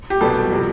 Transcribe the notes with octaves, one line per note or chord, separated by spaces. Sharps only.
G4
C2 B2 G3 B3 A4
C3 F3